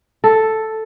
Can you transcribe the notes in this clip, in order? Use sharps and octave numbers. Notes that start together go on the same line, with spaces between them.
A4